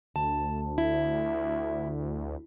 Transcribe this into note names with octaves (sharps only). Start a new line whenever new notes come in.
D2 A5
E4